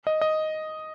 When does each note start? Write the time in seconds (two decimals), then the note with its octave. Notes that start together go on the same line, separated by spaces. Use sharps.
0.07 D#5
0.21 D#5